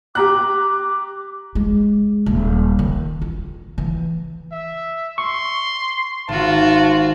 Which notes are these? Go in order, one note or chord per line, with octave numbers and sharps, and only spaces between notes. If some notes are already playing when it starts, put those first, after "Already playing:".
G4 A#5 D6 F#6
G#3
D#1
D#3
F4
E3
E5
C6 C#6
G#1 F4 F#4 A5